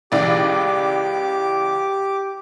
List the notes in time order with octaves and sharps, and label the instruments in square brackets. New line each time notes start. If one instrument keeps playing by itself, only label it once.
[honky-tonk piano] C#2 E3 D5 [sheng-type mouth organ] G4 D6